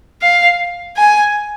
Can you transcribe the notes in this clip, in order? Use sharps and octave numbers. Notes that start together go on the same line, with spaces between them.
F5
G#5